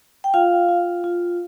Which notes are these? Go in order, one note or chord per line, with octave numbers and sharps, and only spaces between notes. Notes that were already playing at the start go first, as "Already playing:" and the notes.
G5
F4 F5
F4
F4